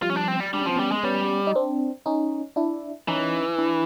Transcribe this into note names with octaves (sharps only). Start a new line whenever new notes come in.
F3 G3 F4
C#4
D4
C4
G3
G3 D4
C#4
F3 C4
G3 B3 C#4
G#3
G3 B3 C#4
D#4
C4 D4
C#4 D#4
D4 E4
E3 C#4 D#4
D4 E4